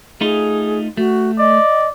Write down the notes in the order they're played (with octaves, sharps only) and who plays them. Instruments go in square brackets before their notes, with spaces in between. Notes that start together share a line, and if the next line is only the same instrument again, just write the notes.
[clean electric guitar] A3 D#4 F4 [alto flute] G#4
[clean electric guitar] A3 [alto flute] F#4
[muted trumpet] D5 [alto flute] D#5